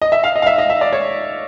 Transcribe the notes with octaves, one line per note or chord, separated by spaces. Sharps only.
D#5
E5
F5
D#5
F5
E5
D#5
E5
D5
C#5